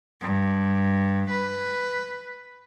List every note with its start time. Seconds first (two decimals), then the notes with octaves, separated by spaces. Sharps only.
0.21 G2
1.30 B4